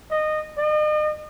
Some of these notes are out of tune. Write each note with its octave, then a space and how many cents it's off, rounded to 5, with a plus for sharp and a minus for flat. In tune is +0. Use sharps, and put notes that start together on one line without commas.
D#5 -20
D#5 -40